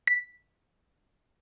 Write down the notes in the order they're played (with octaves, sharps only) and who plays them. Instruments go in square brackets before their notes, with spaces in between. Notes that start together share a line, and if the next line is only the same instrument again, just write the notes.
[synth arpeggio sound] B6